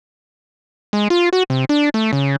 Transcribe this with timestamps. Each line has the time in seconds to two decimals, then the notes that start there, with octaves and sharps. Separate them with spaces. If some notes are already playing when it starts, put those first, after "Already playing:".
0.93 G#3
1.10 F4
1.33 F#4
1.50 C3
1.69 D4
1.94 A3
2.13 C#3